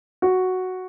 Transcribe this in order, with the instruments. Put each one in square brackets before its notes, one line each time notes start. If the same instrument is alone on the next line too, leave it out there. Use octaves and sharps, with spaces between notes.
[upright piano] F#4